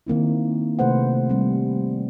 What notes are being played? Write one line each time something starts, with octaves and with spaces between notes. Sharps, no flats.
D#3 A#3 C4 E4
C3 A3 B4 C5 F#5
G3 C4